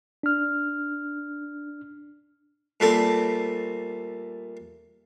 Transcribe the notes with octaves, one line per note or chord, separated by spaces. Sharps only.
D4 F6
A#2 G3 A3 C4 A4